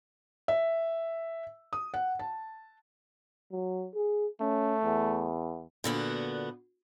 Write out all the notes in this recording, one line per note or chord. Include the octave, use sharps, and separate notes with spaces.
E5
D#6
F#5
A5
F#3
G#4
A3 C#4
E2
A#2 D3 B3 F#4